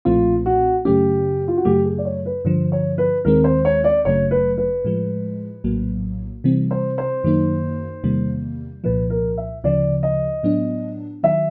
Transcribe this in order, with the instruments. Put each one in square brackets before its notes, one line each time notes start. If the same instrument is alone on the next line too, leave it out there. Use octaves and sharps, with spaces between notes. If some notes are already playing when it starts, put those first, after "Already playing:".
[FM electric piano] B1 A#2 F3 A3 C4 [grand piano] F4
[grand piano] F#4
[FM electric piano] F#2 C#3 F#3 A3 C#4 [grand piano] G4
[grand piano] F4
F#4
[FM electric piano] F#2 C#3 F#3 A3 [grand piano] G4
[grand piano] G#4
D5
C#5
B4
[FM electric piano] G2 D3 F3 [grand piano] C5
[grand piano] C#5
B4
[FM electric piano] D#2 D#3 G#3 C4 [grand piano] A#4
[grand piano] C5
C#5
D5
[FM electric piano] G1 F#2 C#3 F#3 A3 [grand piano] C#5
[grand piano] B4
B4
[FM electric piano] A2 F3 G#3
A#1 A2 F#3 A#3
C3 E3 G3 C4
[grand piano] C5
C5
[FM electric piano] F#2 D#3 F#3 A#3 D#4
E2 C3 D#3 G3 A#3
[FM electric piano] C2 A#2 F3 [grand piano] B4
[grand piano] A#4
E5
[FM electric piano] D2 C#3 F3 [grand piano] D5
[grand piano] D#5
[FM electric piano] A2 F#3 B3 D4
[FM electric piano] D#3 F#3 [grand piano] E5